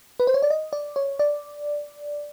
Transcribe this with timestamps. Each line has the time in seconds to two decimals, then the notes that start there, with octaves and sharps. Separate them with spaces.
0.20 B4
0.27 C5
0.34 C#5
0.42 D5
0.50 D#5
0.73 D5
0.96 C#5
1.19 D5